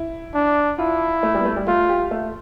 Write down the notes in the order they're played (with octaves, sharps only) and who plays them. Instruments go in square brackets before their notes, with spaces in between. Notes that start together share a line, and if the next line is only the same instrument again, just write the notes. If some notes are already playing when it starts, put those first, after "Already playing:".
Already playing: [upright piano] E4
[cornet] D4
[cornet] E4 [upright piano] F4
[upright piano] A3
G3
B3
A3
G3
[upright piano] A3 [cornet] F4
[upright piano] G4
A3